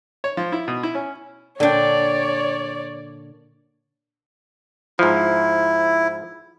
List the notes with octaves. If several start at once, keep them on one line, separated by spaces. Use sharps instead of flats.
C#5
F3
E4
B2
E4
C#4
A#2 D3 D4 C#5 D5 G5
G#2 F3 E4